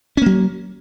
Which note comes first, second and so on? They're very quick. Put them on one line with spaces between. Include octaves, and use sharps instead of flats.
C#4 A#3 F#3